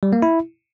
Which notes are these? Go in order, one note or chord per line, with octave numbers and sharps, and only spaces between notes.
G3
A#3
E4